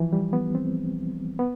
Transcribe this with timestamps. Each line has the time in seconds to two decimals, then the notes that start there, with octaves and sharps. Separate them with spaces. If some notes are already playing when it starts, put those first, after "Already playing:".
Already playing: E3 F3
0.13 G3
0.33 B3
0.55 C4
1.39 B3